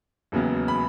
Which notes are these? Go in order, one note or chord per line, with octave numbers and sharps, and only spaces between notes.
E1 D#2 C#3 F#3 B3
B5